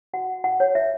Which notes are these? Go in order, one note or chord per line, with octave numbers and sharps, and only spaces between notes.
F#4 F#5
F#5
C#5
E5